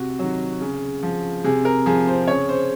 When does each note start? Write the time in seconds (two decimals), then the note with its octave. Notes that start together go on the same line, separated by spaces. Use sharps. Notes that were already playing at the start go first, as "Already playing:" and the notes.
Already playing: C3 F#4
0.19 D#3 F#3
0.61 C#3
1.03 F3
1.44 C3 G#4
1.65 A#4
1.86 F3 G#4
2.07 C5
2.28 C#3 C#5
2.49 C5